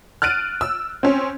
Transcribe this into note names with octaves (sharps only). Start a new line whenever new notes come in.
F6 F#6 A6 D7 D#7
E6
C4 C#4